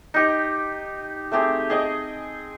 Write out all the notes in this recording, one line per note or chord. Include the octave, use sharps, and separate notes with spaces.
D#4 G4
A3 C4 G4 G#4
G#4 D#5 G5